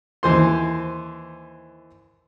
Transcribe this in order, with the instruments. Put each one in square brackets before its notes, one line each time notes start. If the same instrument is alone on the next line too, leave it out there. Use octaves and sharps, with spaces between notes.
[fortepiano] D#2 E3 C5 C6